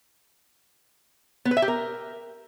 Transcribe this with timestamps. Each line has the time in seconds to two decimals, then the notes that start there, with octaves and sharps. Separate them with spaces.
1.45 B3
1.51 B4
1.57 E5
1.62 G4
1.68 A#4